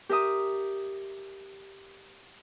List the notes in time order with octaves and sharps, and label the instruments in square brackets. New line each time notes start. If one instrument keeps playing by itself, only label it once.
[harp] G4 A#4 E5 A#5 D#6